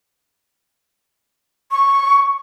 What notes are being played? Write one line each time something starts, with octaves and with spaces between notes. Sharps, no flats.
C#6